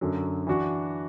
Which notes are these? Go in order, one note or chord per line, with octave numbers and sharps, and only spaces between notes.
F#2 D3 F#3
E3 D4 F#4